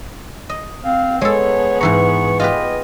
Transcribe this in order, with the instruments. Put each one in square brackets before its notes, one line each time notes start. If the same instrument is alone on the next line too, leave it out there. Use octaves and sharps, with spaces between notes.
[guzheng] D#5
[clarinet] C4 [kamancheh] F5
[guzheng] G#3 A4 [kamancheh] B3 G#4 [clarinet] C#5
[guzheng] G#2 E3 A#5 [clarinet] C#6
[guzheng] F4 G4 B4 [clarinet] D#5